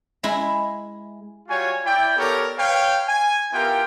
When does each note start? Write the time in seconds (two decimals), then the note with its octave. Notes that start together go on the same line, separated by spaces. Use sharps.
0.23 G#3 E4 A#5
1.48 G3 F4 F#4 C#5 G#5
1.85 E4 D5 G5
2.17 B3 G4 A4 A#4 C#5 D5
2.58 B4 C#5 F5 G5
3.07 G#5
3.53 B3 E4 F4 G4 A#4 G5